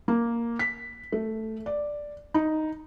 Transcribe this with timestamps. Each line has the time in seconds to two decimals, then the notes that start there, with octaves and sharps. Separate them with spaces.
0.08 A#3
0.59 B6
1.12 A3
1.66 D5
2.34 D#4